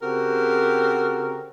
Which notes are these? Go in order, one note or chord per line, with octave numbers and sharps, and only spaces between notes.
C#3 C4 F#4 G4 A4 A#4